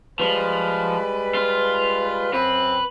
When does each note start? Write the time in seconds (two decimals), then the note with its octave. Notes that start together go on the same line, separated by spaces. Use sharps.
0.20 F3 G3 G#3 B4
1.34 F4
2.33 F#2 C4 B4